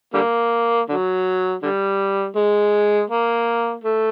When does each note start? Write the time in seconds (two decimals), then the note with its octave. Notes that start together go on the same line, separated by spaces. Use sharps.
0.14 D3 G3 A#3
0.89 D3 F#3
1.62 D3 G3
2.36 G#3
3.10 A#3
3.84 A3